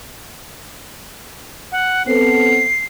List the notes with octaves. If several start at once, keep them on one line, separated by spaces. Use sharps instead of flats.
F#5
B3 C4 A4 C7